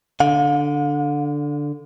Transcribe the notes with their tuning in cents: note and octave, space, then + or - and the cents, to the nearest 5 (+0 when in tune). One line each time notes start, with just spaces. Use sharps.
D3 +0 F5 +45